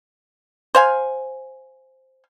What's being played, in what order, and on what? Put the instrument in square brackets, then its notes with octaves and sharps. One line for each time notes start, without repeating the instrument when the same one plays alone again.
[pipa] C5 F5 G#5